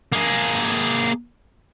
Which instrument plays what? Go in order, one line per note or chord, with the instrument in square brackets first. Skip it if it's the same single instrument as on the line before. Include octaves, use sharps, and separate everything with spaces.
[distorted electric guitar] A#3 G#4